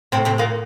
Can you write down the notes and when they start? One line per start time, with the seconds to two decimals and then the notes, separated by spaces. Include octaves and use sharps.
0.12 A2 C3 C4
0.25 C3 C4
0.38 A#2 A#3